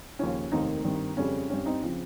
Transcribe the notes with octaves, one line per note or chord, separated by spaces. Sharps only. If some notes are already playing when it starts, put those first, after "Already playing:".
D#2 C#3 F3 C#4
F1 D#2 D#3 A#3 C4 D#4
G2 D#3 G3 C4
F2 C#3 G3 C4 C#4
G2 G3 C4 C#4
C4 D#4
C#3 F3 C4